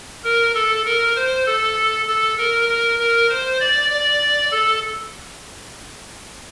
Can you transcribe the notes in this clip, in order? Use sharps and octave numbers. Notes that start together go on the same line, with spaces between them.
A#4
A4
A#4
C5
A4
A4
A#4
A#4
A#4
C5
D5
D5
A4